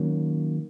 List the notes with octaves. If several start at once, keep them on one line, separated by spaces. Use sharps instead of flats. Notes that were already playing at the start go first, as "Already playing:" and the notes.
Already playing: D#3 F#3 A#3 C#4